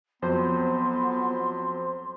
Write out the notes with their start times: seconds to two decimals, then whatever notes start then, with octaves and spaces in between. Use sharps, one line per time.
0.22 F2 F#3 B3 C5 C6